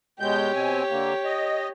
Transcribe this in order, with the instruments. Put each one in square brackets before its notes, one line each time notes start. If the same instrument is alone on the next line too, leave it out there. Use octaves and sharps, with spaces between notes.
[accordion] B2 G#3 G6 [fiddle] G4 C#5
[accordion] B2 C4 G#5
D3 A#3
D#5